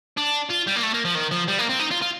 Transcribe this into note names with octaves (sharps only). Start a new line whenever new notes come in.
D4
F4
G3
A#3
A3
A#3
F3
D#3
F3
G3
A#3
C4
D#4
F4
F4